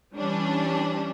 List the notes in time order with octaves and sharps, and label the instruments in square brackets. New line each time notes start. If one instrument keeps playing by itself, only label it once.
[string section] E3 G3 C#4 D4